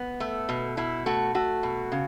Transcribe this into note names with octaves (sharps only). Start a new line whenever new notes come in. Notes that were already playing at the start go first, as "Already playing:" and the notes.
Already playing: B3
A3
B2
B2 E4
A3 F#4
A3 F#4
B2
C#3